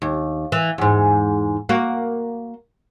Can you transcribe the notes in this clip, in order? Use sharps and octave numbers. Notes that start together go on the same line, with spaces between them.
D#2
E3
E2 G#2
A#3 F#4